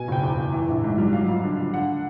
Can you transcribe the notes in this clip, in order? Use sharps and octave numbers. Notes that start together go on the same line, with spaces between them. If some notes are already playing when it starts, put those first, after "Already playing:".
Already playing: B2 G#5
F#1 G5
E2
F#1
E3
A#1
G#2
G3
F#3 F5
F2
D3
F2
D3 F#5